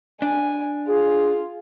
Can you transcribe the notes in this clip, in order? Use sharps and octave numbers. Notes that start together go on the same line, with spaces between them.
D4 G#5
F4 G#4